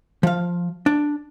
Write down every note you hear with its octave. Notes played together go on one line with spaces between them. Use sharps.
F3 F5
D4